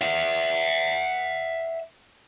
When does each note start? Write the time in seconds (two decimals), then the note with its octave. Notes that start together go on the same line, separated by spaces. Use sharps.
0.01 E5 F#5